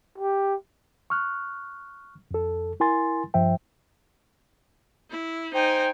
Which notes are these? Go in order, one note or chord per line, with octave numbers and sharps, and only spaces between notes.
G4
C#6 F6 F#6
F2 A4
E4 A#4 G#5 C6 A6
G2 F3 C5 E5 G5
E4
D#4 C5 G5 G#5